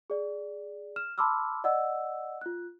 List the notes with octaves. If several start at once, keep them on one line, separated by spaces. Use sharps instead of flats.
G#4 D5
F6 E7
A5 B5 C6 D6 E6 F6
D5 D#5 F#5 E6
F4 F#6